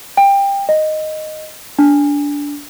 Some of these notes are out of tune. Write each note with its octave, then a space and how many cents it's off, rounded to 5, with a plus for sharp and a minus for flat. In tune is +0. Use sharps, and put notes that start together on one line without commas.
G5 +20
D#5 -5
D4 -20